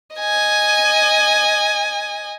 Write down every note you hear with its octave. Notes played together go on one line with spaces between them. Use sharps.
D#5 G#5